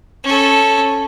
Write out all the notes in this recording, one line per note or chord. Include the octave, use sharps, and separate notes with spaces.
C#4 A4